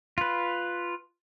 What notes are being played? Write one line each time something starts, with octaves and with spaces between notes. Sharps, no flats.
F4 B4